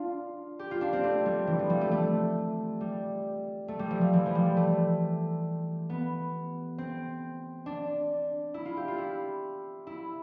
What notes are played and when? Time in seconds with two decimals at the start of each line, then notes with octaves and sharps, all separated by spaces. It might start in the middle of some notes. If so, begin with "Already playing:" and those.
Already playing: D4 F4
0.59 G4
0.71 F4
0.81 D4
0.93 C4
1.04 A3
1.26 G3
1.47 E3
1.59 F3
1.70 G3
1.81 A3
1.91 A3
2.81 G3
3.68 A3
3.79 G3
3.91 F3
4.01 F3
4.13 E3
4.26 F3
4.35 G3
4.57 A3
5.89 B3
6.78 C4
7.66 D4
8.54 E4
8.65 F4
8.77 G4
8.88 F4
8.98 E4
9.87 E4